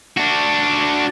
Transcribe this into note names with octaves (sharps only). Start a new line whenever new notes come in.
D4 F#4